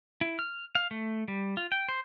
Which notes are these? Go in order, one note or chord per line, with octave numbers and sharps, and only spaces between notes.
E4
F6
F5
A3
G3
F4
G5
C5